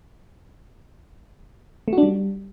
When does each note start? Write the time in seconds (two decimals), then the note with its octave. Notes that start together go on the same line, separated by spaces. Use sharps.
1.88 A3
1.93 F#4
1.98 D4
2.03 G3